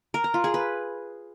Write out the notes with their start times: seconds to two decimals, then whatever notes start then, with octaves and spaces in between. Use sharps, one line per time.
0.14 A#4
0.24 A#5
0.34 F4
0.44 G#4
0.54 B4